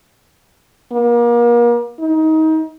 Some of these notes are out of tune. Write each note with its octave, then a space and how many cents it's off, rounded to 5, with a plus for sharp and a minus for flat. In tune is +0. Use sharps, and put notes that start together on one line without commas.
A#3 +35
D#4 +25